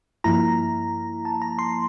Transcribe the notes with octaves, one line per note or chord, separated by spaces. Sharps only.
G2 F3 A#3 E4 A#5
A5
A#5
C6